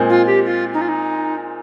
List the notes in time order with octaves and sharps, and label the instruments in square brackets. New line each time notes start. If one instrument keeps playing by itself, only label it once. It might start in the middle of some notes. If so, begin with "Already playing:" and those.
Already playing: [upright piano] A#2 G#3 C4
[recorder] F4
G4
F4
D#4
F4
D#4